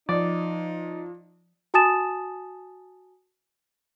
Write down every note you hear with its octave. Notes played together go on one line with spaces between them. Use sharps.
F3 D#4 D5
F#4 G#5 A5 D#6 A6 E7